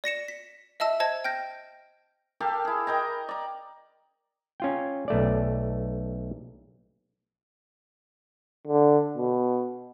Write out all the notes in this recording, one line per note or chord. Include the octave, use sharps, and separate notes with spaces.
D5 A#6 C#7 E7
B6
D#5 E5 A5 E6
C5 D#5 A5 G#6
G5 F6 G6 A#6
G4 A4 A#4 F5
E4 G#4
A#4 D#5 G5 A#5
D5 A#5
C#4 F4 G5
B1 A3 D5
D3
B2